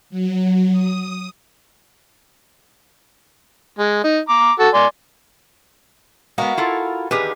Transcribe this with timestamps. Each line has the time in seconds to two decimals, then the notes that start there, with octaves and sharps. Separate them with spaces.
0.10 F#3
0.72 D#6
3.78 G#3
4.03 D#4
4.29 A#5 D6
4.59 F#4 A4
4.74 D5 G#5 C6
6.38 G#3 B3 F#4 A#4 F5
6.58 E4 F4 A4
7.11 E2 D3 D#3 G4 G#4 B4